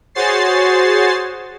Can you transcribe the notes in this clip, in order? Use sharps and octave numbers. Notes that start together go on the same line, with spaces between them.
F#4 G#4 C5 C#5 A6 C7